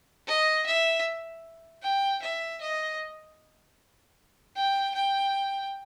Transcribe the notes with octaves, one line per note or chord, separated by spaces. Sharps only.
D#5
E5
G5
E5
D#5
G5
G5